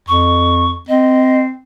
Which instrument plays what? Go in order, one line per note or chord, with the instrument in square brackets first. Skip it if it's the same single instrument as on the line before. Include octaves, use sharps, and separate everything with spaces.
[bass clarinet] F2 [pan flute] C#6
[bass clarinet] C4 [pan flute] D#5